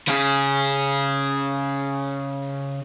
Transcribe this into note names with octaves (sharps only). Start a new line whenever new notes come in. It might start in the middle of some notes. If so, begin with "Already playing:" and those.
C#3 G#4